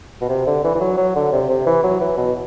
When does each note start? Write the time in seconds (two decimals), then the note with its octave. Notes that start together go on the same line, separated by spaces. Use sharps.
0.21 B2
0.29 C3
0.46 D3
0.64 E3
0.75 E3
0.80 F#3
0.97 F#3
1.15 D3
1.32 C3
1.49 C3
1.66 E3
1.83 F#3
2.00 E3
2.17 B2